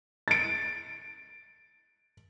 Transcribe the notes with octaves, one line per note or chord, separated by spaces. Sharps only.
A6 D7